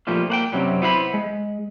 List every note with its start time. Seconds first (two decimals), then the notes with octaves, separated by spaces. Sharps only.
0.07 A#2 F3 G3 A3 A#3
0.30 A#3 F#5 G5
0.53 F#2 C3 F#3 G3
0.82 B3 E4 C5 F5 B5
1.14 G#3